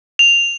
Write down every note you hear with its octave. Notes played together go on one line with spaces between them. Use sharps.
F7